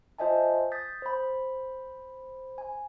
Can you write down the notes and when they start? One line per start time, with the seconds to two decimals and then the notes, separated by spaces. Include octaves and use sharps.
0.18 F4 C5 D#5 E5 G#5 A5
0.72 D#6 G6 A6 B6
1.02 C5 B5
2.58 G#5